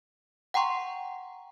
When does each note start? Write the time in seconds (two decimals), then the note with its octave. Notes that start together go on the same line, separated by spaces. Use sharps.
0.54 F#5 G5 A#5 C6 C#6